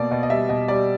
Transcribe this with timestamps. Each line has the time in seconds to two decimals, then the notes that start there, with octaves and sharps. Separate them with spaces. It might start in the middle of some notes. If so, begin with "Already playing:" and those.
Already playing: B2 A#3 D5
0.11 B2 D#5
0.23 D#5
0.30 G3 E5
0.49 B2 D#5
0.68 G3 D5